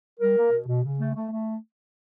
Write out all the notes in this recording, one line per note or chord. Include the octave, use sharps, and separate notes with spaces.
G3 A#4
A#3
B2
B2
C#3
A3
A3
A3